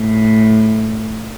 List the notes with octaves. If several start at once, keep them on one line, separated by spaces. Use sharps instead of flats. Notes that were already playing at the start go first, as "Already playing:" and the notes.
Already playing: A2